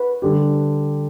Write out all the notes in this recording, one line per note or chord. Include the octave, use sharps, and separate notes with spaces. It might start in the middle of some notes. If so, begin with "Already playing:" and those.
Already playing: B4
D3 G3 D4 G4